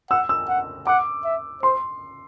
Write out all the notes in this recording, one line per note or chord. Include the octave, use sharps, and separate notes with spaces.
F#5 E6
E6
F#5
F#5 D6
E5
C5 C6